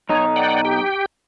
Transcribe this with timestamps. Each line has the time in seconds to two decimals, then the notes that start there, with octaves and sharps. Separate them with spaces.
0.09 B1 D#4 C#5
0.36 D5 F#5 G5
0.65 G4 G5